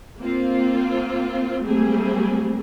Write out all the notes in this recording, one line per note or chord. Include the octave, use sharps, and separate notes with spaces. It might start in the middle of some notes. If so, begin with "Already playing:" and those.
A#3 C4 F4
F#3 G3 A3 A#3 C4 G#4